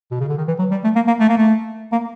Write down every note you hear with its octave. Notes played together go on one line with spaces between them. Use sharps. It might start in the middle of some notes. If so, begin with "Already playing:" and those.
B2
C#3
D3
D#3
E3
F#3
G3
A3
A#3
A#3
A3
A#3
A3
A#3